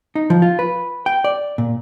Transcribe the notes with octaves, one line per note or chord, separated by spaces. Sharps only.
D#4
F3
F4
B4
G5
D5
A#2